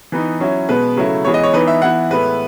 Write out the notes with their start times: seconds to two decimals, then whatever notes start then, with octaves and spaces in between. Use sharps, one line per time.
0.12 E3 B3 D#4
0.40 F#3 C#4 E4
0.69 B2 G#3 B3 B4
0.96 C#3 F#3 A3 E4
1.25 E3 G#3 B3 C#5
1.34 D#5
1.43 C#5
1.53 E3 B3 D#4 B4
1.67 E5
1.82 E3 B3 E4 F#5
2.10 A2 G#3 B3 E4 B4